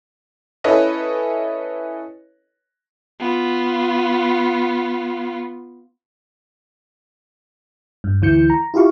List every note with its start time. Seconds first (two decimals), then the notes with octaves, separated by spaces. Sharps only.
0.64 C#4 E4 A4 B4 C#5 D#5
3.20 B3 F4
8.04 G2
8.22 D2 E3 G6 C#7
8.50 A#5
8.74 E4 F4 G4 F5 C#6